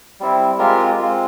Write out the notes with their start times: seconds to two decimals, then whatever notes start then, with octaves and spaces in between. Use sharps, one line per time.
0.20 G3 C4 E4
0.58 G#3 C4 F4 G4 A#4
0.98 G#3 C4 F4